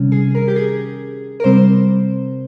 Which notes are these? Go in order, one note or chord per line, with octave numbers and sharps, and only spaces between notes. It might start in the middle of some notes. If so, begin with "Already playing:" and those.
Already playing: C3 D#3 G3 C#4
G#4
A#4
G4
G#4
A#4
C3 G3 C4 C5